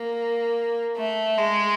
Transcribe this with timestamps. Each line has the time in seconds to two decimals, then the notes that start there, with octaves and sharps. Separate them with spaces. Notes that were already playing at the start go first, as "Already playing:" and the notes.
Already playing: A#3
0.97 A3
1.38 G#3